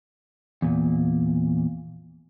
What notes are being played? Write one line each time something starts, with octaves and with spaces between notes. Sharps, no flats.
E2 A#2